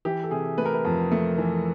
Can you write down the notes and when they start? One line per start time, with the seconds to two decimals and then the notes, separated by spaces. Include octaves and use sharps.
0.05 E3 G4
0.24 A4
0.31 C3 G#4
0.58 A3 B4
0.65 A#4
0.74 B4
0.85 F2
1.12 A3
1.38 E3